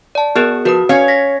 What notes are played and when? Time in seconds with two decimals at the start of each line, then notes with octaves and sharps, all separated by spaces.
0.15 D5 A5
0.35 B3 F#4 G#4 A#4
0.65 F3 F#4 B4 D#6
0.89 C#4 C#5 F5
1.08 A#6 B6